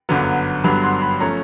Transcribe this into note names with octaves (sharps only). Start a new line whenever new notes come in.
G1 F#2 D3 F#3 B3
G2 D3 F#3 B3 B5
C6
B5
F3 A3 C#4 A#5